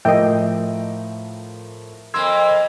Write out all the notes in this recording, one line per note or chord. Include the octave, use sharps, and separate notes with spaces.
A2 F3 A#4 D#5 E5 G5
F2 A#3 C6 E6 G#6